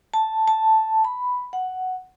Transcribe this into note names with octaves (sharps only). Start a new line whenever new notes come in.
A5
A5
B5
F#5